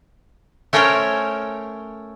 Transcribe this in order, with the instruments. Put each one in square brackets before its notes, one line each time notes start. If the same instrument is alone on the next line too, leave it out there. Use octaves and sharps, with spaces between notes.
[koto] A3 C#4 A#4 C5 C#5 G5